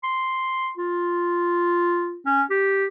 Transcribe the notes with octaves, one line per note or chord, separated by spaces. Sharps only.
C6
F4
C#4
G4